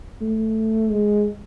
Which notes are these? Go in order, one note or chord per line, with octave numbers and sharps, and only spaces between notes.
A3
G#3